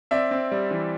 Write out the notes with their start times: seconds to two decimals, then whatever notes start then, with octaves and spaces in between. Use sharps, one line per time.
0.11 C4 D5 E5
0.31 C4
0.52 G3
0.71 E3